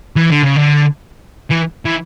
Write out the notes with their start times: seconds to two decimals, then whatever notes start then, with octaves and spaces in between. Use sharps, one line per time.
0.16 E3
0.30 D3
0.43 C#3
0.56 D3
1.51 E3
1.85 E3